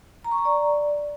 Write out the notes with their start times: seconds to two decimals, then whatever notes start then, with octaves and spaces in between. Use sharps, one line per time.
0.25 A#5
0.31 C#6
0.38 A#5
0.45 D5